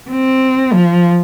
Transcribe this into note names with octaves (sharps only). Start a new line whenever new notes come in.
C4
F3